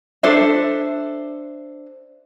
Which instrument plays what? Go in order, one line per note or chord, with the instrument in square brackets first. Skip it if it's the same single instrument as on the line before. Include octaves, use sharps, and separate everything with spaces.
[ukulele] D4 A4 C5 E5